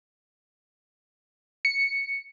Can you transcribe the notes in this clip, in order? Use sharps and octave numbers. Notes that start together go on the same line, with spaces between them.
C#7